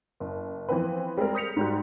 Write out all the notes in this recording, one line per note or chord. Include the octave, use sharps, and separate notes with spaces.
F#1
E3 F3 B3 C4 B4
G3 G#3 C4 A4 A#4
D#6 G6 A#6 B6 C#7 F7
G#2 G3 F#4